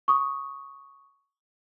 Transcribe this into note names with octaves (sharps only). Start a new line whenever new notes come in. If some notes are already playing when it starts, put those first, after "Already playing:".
C#6 D#6